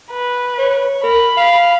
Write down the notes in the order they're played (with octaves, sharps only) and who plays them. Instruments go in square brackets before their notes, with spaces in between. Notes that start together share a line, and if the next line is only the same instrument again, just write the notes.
[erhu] B4
[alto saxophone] C#5
[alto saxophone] A#4 [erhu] B5
[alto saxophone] F5